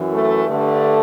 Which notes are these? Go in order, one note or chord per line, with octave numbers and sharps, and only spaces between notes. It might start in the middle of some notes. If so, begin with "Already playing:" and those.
Already playing: F#2 E3
A3
G2 D3 A3